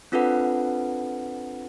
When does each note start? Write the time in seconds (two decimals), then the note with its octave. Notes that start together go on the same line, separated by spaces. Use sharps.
0.12 C4 D4 F4 A4 B4 F#5